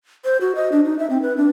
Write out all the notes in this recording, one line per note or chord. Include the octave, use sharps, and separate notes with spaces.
C5
F#4
D#5
D4
D#4
E5
C4
B4
D4